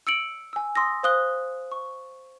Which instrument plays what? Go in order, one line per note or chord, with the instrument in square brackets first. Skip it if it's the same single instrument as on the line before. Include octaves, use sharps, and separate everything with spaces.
[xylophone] E6 C#7 D7 F#7
G#5 E6
C6 D#6 E6 A#6
C5 F5 D#6 F#6 G7
C#6